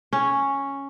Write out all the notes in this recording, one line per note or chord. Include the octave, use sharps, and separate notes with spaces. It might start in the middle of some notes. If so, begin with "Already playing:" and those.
C#4